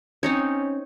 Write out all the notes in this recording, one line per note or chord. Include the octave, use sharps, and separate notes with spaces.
C4 C#4 D#4 C#5